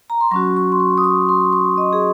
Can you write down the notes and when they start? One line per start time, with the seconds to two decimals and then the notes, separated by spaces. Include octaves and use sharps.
0.10 A#5
0.21 C6
0.31 F#3 C#4 F#4 C#6
0.57 C#6
0.72 C6
0.80 C#6
0.98 D#6
1.04 C#6
1.29 C6
1.53 C#6
1.78 D#5
1.93 G#4